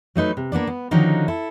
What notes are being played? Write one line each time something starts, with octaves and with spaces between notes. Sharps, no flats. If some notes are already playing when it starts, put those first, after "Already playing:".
F#3 A3 D#4 B4
C3
A#3 B3 D4 D5
B3
D3 D#3 F3 C#4 D#4 F#4
E4 A4